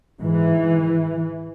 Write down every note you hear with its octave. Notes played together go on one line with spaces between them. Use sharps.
G#2 E3